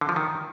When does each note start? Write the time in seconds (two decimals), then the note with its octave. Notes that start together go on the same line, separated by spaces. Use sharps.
0.01 D3
0.09 F3
0.16 D#3